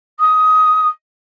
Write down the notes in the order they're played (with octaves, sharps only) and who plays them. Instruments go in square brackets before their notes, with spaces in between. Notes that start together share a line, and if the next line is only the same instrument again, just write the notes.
[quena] D#6